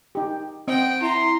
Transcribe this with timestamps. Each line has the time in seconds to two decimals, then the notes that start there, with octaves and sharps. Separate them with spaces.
0.15 D#4 G4
0.68 C4 D#5 F#5 G5
1.02 E4 A#5 C6